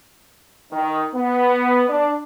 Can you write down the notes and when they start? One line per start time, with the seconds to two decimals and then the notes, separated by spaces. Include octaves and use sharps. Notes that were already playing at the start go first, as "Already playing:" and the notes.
0.72 D#3
1.14 B3
1.89 D4